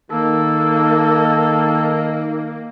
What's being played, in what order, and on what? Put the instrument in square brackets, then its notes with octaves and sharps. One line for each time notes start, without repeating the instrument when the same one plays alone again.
[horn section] D#3 [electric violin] A#3 [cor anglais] A4